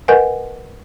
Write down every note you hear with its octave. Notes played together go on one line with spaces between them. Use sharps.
A#4 B4 D#5 F#5 G#5